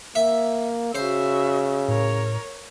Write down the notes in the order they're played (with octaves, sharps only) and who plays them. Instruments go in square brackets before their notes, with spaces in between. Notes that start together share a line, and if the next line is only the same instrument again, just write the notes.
[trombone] A#3 [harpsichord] E5
[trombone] C#3 [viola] F#4 E5 [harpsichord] C5
[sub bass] A2 [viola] A#4 C#5